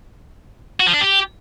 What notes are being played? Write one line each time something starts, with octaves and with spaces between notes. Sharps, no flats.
F#4
F3
D4
G4